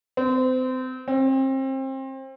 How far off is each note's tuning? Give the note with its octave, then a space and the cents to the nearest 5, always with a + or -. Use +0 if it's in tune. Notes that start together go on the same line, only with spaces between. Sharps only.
C4 -30
C4 +30